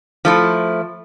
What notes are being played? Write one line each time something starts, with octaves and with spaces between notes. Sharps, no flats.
F3 A3 E4